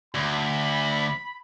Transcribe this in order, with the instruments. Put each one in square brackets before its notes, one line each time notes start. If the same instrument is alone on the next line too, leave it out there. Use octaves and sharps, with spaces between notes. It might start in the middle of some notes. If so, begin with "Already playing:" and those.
[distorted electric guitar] D2 [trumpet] B5